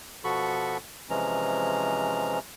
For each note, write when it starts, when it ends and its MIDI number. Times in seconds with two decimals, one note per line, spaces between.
0.24 0.77 47
0.24 0.77 53
0.24 0.77 66
0.24 0.77 69
0.24 0.77 83
0.24 0.77 85
1.10 2.39 48
1.10 2.39 52
1.10 2.39 53
1.10 2.39 56
1.10 2.39 61
1.10 2.39 82